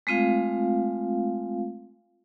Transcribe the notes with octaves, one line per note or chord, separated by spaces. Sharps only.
G#3 A3 C4 F4 F5